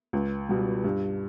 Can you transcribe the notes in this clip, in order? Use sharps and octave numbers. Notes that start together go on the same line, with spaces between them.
C#2
B2 G3
G2